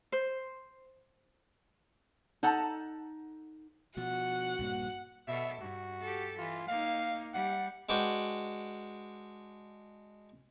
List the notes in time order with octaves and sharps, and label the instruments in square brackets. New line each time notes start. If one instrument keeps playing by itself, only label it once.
[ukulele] C5
[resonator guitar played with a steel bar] D#4 A4 F#5 A5 A#5
[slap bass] B2 F3 [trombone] F#4 [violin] F#5
[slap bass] A#1 G2 A#3
[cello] B2 A4 [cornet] E5
[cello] G2 [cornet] F#4
[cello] G4 A4
[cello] E3 [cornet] F4
[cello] A#3 D#4 [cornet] F5
[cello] G3 [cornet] F#5
[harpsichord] G#3 D4 F#4 B4 G5